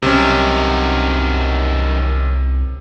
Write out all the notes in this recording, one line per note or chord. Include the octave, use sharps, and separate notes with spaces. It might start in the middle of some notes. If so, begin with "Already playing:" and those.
C2 F#2 C3 D#3 C#4